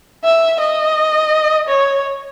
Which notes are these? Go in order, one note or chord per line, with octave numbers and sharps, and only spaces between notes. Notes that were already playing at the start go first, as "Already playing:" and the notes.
E5
D#5
C#5